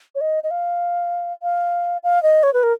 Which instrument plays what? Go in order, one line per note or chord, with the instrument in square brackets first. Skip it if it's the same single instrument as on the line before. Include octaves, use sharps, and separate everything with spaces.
[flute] C#5
D#5
D#5
F5
F5
F5
D#5
C#5
B4
A#4